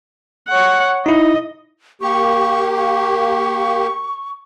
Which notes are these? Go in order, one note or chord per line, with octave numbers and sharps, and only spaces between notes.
C#5 F#5
D#4 E4 D#5
A#3 G4 C#6
C#6